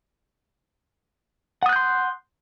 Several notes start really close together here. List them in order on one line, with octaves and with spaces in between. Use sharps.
F#5 D#6 F#6 G6 C6